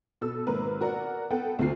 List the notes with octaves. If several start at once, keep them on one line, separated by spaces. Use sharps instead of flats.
B2 A4 E6
G#1 A#3 A#4 B4
F#4 A#4 D5 F#5
B3 A4 F#5 G5
D2 C3 F4 C7